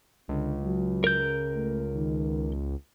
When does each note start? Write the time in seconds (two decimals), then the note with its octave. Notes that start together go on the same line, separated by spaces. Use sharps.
0.29 C#2 D3
0.63 F#3
1.04 A#4 G6
1.55 A3
1.95 D#3